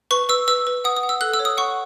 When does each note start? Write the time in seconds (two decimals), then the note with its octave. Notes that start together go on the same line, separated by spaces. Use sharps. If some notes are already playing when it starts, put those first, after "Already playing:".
0.11 B4 C#6
0.29 B4 E6
0.48 B4 E6
0.67 B4
0.84 F#5 D#6
0.97 D#6
1.03 F#5
1.09 E6
1.21 A4 F#6
1.34 E6
1.39 C#5
1.45 D#6
1.57 F#5 C#6